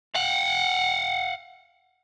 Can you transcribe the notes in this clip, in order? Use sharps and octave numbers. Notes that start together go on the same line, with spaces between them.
F5 F#5